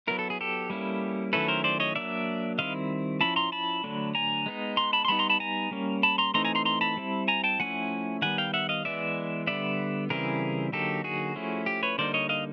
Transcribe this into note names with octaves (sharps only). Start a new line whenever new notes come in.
F#3 B3 E4 A#4
A4
G#4
G4 A4
G3 A#3 C#4 E4
D#3 F#3 A3 C#4 E4 A4 B4
A#4 C5
C5 D5
C#5 D#5
F#3 A#3 D4 D5 E5
D#3 G3 C4 E4 D#5 F5
F3 A#3 C#4 E4 A5 B5
A#5 C6
A5 B5
D3 F#3 A3 D4
G#5 A#5
G#3 B3 D#4
A#5 C6
A5 B5
C6
G3 B3 D#4 A5 B5
A#5 C6
A5 B5
G#5 A#5
G3 A#3 C#4
A5 B5
A#5 C6
E3 A3 C4 D#4 A#5 C6
G#5 A#5
A#5 C6
A#5 C6
A5 B5
G3 C4 E4
G#5 A#5
G5 A5
F3 A3 C#4 E4 F#5 G#5
D#3 G3 B3 F#5 G#5
F5 G5
E5 F#5
D#5 F5
E3 G#3 B3 D5 E5
D3 G3 B3 D5 E5
C#3 E3 G3 C4 E4 G#4 A#4
D3 F#3 A#3 D#4 G4 A4
F#4 G#4
F3 A3 C#4 E4
G4
B4 C#5
D3 G3 A#3 D#4 C5 D5
C#5 D#5
D#5 F5